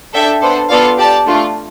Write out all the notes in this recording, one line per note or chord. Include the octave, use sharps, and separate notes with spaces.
D4 A4 E5 G5
B3 D4 A4 C5
B3 F4 A4 D5 F5
G4 D5 A5
A3 D4 F4